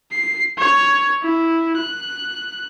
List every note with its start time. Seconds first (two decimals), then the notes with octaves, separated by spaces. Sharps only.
0.11 C7
0.58 C#5
1.22 E4
1.77 F#6